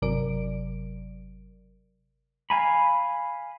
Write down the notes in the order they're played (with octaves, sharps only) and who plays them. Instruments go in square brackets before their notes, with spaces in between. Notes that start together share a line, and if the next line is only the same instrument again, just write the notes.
[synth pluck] G1 C3 F#3 A#4 D5 D7
[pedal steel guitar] F5 G#5 B5